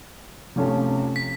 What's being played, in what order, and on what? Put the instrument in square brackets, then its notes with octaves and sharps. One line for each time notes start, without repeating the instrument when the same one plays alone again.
[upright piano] C3 F3 A3 C#4 F4
[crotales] B6